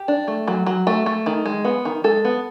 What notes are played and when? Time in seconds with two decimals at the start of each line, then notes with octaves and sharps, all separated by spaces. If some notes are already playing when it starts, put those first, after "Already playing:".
Already playing: G4
0.08 D4
0.28 A3
0.48 F#3
0.66 F#3
0.87 A3
1.06 A3
1.26 D#3
1.46 G#3
1.65 B3
1.85 D#3
2.04 G#3 A4
2.25 B3